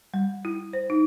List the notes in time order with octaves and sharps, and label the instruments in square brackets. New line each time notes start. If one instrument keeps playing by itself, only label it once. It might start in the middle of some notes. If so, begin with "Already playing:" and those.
[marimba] G3
E4
C5
D#4